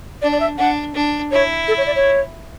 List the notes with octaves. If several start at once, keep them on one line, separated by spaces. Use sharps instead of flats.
D4 D5
D5
E5
D4 F#5
D4
E4 C#5
A4
C#5
D5
C#5